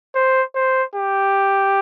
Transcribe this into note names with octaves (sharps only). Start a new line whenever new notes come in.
C5
C5
G4